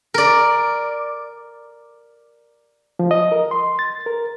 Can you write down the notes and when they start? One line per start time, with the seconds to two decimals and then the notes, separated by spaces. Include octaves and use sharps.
0.14 A#4 D5
2.99 F3
3.11 D#5
3.32 A#4
3.51 C6
3.79 A6
4.06 A#4